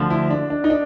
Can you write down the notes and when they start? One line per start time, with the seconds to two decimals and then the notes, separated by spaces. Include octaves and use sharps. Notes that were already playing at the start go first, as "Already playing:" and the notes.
Already playing: D2 D3 F3
0.10 E4
0.30 D4
0.50 D4
0.64 D#4
0.70 D4